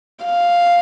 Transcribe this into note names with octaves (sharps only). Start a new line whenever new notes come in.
F5